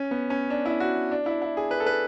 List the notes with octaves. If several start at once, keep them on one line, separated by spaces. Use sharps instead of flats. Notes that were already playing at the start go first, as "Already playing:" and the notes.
Already playing: C#4
B3
C#4
D4
E4
F#4
D4
E4
E4
G#4
B4
A4
B4